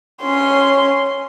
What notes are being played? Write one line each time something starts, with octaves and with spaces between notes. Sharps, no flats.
C#4 C6